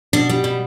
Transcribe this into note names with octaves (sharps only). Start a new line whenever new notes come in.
B2 D4
G3
B2